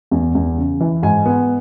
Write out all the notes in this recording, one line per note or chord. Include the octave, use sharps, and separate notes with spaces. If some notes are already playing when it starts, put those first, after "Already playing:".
E2
E2
C#3
E3
G#2 G#5
B3